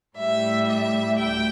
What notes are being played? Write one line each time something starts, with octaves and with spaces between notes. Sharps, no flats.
A2 G3 E5
E5
D2 G5